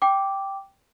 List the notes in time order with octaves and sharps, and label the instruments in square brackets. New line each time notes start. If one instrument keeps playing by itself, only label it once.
[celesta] G5 D6